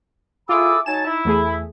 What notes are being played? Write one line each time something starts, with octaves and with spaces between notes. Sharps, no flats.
E4 F4 G#4 A4 B5 D6 E6
F#3 D#4 G#5 A5 E7
E4
E2 A3 G#4 B5